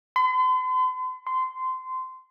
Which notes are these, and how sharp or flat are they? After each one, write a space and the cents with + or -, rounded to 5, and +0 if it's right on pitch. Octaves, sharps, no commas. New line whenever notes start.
C6 -45
C6 -20